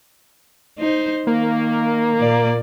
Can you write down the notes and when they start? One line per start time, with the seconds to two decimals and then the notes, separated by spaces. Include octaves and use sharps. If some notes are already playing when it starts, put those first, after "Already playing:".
0.78 D#4 C5
1.27 D#3 A#3
2.17 A#2 D5